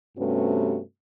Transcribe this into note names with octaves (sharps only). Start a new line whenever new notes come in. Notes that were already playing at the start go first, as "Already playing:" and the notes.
G2 C3 A3 B3 C#4 F#4